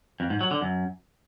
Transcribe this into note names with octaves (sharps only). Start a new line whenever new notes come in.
F2
G#2
F#3
D3
F#2